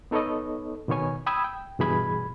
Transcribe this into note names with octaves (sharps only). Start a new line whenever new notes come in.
B3 D#4 A4 B4 C#5 D#5
B2 D#3 B3 C#5 G#5
G5 B5 D#6 E6 G#6
G5
G2 B2 E3 G#4 B5 G#6